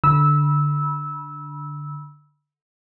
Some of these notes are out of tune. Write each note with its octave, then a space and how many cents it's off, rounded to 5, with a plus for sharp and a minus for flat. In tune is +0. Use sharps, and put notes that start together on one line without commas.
D3 +0 B5 -30 E6 -15